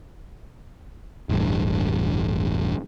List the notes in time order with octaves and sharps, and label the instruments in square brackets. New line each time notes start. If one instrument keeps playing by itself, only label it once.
[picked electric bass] E1 A1 G2